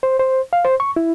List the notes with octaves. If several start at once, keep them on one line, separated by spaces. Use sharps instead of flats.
C5
C5
F5
C5
C#6
E4